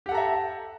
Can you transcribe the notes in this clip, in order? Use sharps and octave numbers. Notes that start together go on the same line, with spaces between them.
G4 A4 E5 F#5 A#5